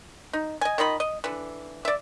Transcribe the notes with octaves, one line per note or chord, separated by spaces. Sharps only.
D#4
D#5 G#5
D#3 F4 D#5 B5
D#5
D3 E3
D5 E5